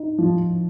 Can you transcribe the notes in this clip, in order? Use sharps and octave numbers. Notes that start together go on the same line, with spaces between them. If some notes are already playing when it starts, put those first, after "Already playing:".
Already playing: D#4
F3